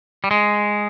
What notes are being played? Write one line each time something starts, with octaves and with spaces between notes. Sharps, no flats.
G3
G#3